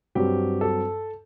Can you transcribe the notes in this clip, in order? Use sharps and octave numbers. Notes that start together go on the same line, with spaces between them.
G2 F#3 C4 G4
A4